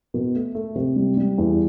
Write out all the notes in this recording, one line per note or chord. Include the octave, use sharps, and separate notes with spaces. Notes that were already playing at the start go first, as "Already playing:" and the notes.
B2
A3
A3
C3
G3
G3
E2